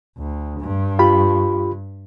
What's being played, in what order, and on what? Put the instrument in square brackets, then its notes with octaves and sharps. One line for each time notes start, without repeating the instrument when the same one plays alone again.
[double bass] D2
G2
[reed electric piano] F4 G4 B5